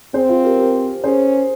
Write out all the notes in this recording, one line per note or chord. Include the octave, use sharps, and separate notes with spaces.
C4 G#4 C5
F4 G#4
G4 A#4
G4 A#4
C#4 G#4 C5